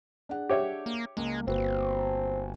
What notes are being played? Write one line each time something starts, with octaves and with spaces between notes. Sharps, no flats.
D4 G#4 F#5
G4 C#5 E5
A#3
C#2 G#3 A#3
G1 A#3 C4 F#4 B4